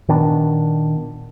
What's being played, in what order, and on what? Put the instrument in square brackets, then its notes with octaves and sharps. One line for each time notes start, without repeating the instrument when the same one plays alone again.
[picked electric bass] A#2 D#3 B3 D4